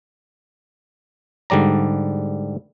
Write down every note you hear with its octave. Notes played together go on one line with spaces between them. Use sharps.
G#2 D3 G3 D5 A#5